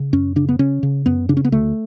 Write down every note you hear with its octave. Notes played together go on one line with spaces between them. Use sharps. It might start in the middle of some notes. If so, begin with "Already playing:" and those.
Already playing: C#3
F#2 C#4
C#3 D4
B3
C#3 C#4
C#3
F#2 B3
C#3 D4
C#4
B3
D2 A3